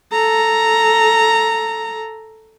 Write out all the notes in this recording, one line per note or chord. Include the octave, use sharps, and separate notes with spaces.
A4 A#5